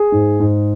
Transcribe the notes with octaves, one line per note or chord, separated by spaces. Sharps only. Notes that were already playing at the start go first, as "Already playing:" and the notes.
Already playing: G#4
G#2
G#2